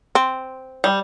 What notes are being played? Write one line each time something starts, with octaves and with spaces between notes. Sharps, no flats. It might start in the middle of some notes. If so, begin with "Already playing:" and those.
C4
G3